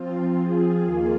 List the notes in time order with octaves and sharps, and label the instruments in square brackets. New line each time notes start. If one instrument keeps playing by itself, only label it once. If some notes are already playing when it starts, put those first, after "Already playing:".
Already playing: [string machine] F3 C4 F4
F3 C4 F4 G#4
D#2 D#3 A#3 F4 G#4